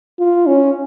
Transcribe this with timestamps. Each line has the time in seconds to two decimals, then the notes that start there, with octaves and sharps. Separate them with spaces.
0.19 F4
0.47 C#4